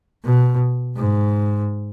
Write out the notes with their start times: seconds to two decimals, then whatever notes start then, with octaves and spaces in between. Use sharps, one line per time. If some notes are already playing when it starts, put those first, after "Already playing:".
0.24 B2
0.96 G#2